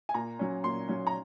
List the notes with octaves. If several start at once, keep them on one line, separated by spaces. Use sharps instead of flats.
G#5
A#2 A#5
F#3 C#4
A#2 C6
F#3 C#4
A#5